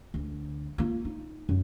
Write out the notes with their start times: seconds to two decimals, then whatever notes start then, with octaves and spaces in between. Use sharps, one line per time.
0.14 D2
0.78 A#3 F4
1.05 D#4
1.49 F#2